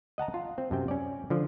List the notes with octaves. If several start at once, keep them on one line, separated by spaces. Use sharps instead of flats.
D#5 F#5 A5 A#5
F4
C4
F#2 C3 G5
C#4 D5
D3 F3